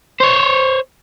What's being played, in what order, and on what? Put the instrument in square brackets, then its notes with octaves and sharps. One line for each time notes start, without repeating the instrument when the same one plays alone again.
[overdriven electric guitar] C5 C#5